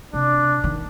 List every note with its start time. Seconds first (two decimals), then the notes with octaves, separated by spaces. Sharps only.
0.13 C3 D4
0.64 D#3